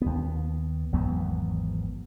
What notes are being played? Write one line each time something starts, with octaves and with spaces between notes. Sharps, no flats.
D#2 B3
G#1 E2 F#3 B3